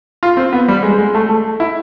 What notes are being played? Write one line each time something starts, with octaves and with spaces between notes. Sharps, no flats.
F4
C4
B3
G3
G#3
G#3
A3
A3
E4